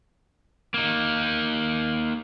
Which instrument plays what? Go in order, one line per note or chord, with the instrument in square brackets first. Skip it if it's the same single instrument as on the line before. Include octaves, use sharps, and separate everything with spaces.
[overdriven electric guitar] A#3 D#4